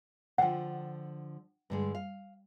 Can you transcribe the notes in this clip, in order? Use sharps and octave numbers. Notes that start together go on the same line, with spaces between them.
D3 F3 F#5 G5
G2 D3 G#3
F5